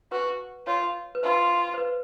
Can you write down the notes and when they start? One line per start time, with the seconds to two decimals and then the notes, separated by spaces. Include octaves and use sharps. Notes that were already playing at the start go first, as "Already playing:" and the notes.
0.12 F#4 B4
0.67 F4 C#5
1.15 B4
1.23 F4 C5
1.74 C5
1.78 B4